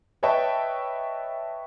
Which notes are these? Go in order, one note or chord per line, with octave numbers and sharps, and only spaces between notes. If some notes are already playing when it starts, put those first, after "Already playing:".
B4 C#5 D#5 E5 G5 A5